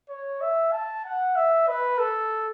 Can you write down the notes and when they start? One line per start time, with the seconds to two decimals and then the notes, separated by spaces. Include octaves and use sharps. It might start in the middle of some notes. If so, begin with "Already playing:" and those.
0.09 C#5
0.41 E5
0.72 A5
1.05 F#5
1.36 E5
1.67 B4
1.98 A4